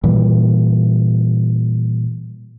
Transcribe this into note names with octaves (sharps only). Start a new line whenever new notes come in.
A#2 E3 G3